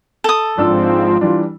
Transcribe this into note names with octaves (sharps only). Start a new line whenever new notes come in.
A4 D#6
G#1 G#2 F3 C4 D4 F4 E6
E3 G3 D4